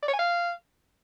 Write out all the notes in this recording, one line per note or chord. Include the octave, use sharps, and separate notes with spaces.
D5
C#5
G#5
F5